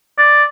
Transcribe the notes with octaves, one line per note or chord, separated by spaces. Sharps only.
D5